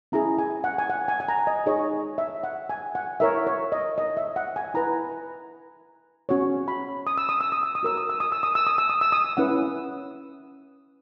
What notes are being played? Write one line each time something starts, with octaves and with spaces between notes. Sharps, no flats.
C#4 E4 G#4 A#5
G#5
F#5
G#5
F#5
G#5
G#5
A#5
D#5
D#4 G#4 C#5 D#5
E5
F#5
G#5
F#5
E4 A#4 C#5 E5
C#5
D#5
D#5
E5
F#5
G#5
E4 B4 A#5
C#4 F#4 C#5
B5
D#6
E6
D#6
E6
D#6
E6
D#6
F#4 A#4 C#5 E6
D#6
E6
D#6
E6
D#6
E6
D#6
E6
D#6
E6
D#6
C#4 E4 B4 F#5